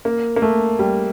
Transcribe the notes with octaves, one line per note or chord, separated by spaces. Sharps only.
A#3
A#3
A3
G3